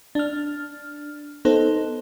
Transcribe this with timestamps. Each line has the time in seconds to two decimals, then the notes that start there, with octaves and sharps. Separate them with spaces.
0.15 D4 F6
1.45 B3 D#4 A4 C5